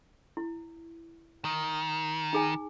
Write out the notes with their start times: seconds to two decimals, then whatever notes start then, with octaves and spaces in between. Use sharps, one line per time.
0.37 E4
1.45 D#3
2.33 D#4 G#4 G#5